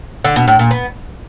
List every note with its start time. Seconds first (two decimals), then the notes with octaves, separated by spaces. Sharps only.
0.24 D3
0.36 B2
0.48 A2
0.59 A#2
0.71 B3